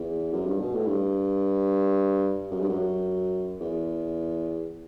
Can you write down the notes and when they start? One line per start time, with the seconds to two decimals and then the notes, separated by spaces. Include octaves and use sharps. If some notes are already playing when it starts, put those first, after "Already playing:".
Already playing: E2
0.33 F#2
0.46 G2
0.61 B2
0.74 A2
0.87 G2
2.51 F#2
2.60 G2
2.69 F#2
3.60 E2